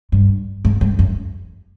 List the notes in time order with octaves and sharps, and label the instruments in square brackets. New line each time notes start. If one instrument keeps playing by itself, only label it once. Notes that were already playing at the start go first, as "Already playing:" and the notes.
[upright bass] G2
G#2
G2
F#2